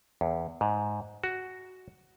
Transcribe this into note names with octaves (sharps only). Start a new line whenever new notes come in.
E2
G#2
F#4